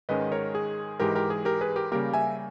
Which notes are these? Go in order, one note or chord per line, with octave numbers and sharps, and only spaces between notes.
G#2 D#3 G#3 C#4 B4 D#5
A#4 C#5
G#4
G#2 E3 G#3 G4 A#4
G4 A#4
G#4
G4 A#4
G#4 B4
G4 A#4
C#3 G3 A#3 G4 A#4
E5 G#5